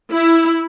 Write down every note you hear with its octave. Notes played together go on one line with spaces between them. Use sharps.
E4